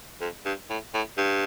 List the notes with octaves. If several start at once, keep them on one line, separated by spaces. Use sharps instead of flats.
F2
G2
A2
A2
G2